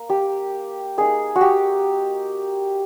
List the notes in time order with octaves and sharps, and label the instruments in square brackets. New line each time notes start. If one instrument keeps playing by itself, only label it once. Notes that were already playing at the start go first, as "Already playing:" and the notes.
Already playing: [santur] A#3
G4
A#3 D#4 G#4
F#4
G4